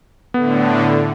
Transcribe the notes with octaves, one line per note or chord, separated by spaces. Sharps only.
A2 D3 B3